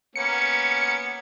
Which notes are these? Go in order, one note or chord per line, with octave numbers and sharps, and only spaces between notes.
A#3 B3 C#4 C#7